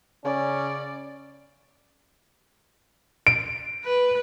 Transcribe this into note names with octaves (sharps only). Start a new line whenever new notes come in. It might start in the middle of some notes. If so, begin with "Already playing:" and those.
C#3 C#4 D5
D7
B4